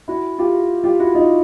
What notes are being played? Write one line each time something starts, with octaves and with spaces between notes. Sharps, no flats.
E4 F#4
F4 G4
F4 G4
E4 F#4
D#4 F4